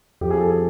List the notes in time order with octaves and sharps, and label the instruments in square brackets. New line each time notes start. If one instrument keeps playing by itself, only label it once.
[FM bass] F2 [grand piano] G4
[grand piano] G#4
A4
G#4